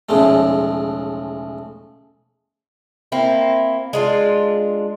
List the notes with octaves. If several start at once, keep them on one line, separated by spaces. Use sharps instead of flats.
B1 E2 C#3 F3 G#3 A3
A#3 C4 E4
G#3 D4 F4